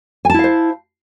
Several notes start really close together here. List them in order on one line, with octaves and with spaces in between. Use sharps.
G#5 A5 E4 F5 C5